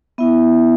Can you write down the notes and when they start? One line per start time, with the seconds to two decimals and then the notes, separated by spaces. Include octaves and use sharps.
0.18 B3 E4 E5